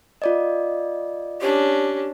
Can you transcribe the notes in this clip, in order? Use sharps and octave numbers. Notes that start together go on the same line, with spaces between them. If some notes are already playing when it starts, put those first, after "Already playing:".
F4 D5 D#5
C#4 D4 G4